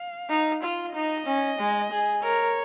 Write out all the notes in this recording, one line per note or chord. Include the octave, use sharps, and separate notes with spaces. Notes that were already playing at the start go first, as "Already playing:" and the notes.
Already playing: F5
D#4
F4
D#4 D#5
C#4
G#3
G#4
A#4 C#5